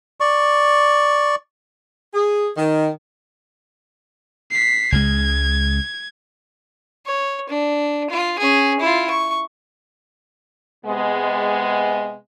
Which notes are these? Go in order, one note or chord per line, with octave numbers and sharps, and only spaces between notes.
D5 C#6
G#4
D#3
B6 C7
C#2 C#3 G#3 G#6
C#5
D4
F4
C#4 G#4
E4 F4
C#6
C3 G#3 B3